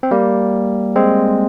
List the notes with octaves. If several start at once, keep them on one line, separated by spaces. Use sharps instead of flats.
C4
G3 A#3
G#3 C4